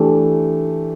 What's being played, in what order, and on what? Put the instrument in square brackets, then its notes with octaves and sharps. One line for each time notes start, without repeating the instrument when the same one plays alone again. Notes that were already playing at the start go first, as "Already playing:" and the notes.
Already playing: [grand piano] E3 A3 D4 G4